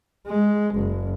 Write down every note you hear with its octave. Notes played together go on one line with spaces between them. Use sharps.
G#3
F#1